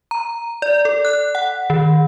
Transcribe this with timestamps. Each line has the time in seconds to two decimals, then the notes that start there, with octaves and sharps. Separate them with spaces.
0.11 A#5
0.62 D5
0.85 A4
1.05 F#6
1.35 F#5
1.70 D#3